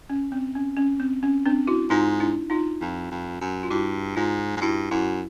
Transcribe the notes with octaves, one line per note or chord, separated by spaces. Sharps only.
C#4
C4
C#4
C#4
C4
C#4
C4 D4
E4 F#4
G#2 D#4 F4
D4 E4
D#4 F4
F2
F2
F#2
F4
G2 E4 F#4
G#2 D#4 F4
G#2
G2 E4 F#4
F#2 E4 F#4